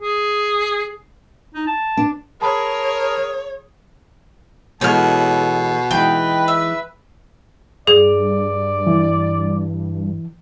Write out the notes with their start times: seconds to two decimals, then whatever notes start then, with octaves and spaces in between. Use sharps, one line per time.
0.02 G#4
1.54 D#4
1.67 A5
1.97 D4
2.42 G#4 A#4 C#5 A5 B5
4.81 B2 E3 G#3 B3 A4 C#5 F6
5.91 E3 G#3 D#4 B4 G5
6.48 E5
7.87 G2 G#4 D5
8.87 E3